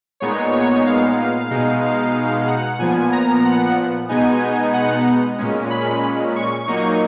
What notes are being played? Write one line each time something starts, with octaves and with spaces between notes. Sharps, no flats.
A#2 G#3 B3 D#4 C#5
C#5
F5
B2 G#3 D#4
F5
F#5
A#2 F3 B3 G#5
A#5
F#5
B2 G#3 B3 D#4 G#5
F#5
A#2 G#3 C#4
B5
C#6
A#2 F#3 A#3 D#4